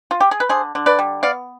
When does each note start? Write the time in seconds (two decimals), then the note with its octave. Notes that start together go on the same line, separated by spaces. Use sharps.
0.11 F4
0.21 G4
0.31 G#4
0.40 B4
0.49 D3 G#4 C5
0.75 D3
0.86 B4 D5
0.99 G3
1.23 B3 D5 F5